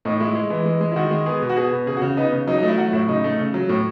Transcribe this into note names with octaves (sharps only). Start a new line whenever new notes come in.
A2 D#4
G#3 E4
G#3
E3
G#3
G#3
E4
D#3 F#4
G#3
B3 G#4
B2
F#4
B3 G#4
B2
C#3 G#4
F#4
C#3
B3 D#4
C#3
F#3 D#4
D#4
A3
E4
F#3 F#4
A2 E4
C#3 D#4
A3
C#3
F#3
A2